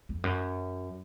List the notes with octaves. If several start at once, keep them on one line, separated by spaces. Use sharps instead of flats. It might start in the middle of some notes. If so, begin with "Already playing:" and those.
F2
F#2